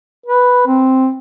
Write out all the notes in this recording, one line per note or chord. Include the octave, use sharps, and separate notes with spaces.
B4
C4